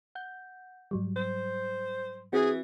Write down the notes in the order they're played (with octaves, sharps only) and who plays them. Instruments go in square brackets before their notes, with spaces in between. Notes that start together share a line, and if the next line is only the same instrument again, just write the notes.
[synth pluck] F#5 G6
G#2 F#3 G3
[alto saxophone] C5
[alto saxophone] E3 [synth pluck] C4 F#4 [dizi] G#4